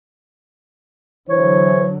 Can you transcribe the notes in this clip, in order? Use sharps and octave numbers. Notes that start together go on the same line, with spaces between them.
D3 E3 F#3 C5 C#5